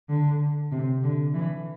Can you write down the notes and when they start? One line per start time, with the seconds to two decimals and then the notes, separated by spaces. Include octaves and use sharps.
0.09 D3
0.72 C3
1.03 D3
1.34 E3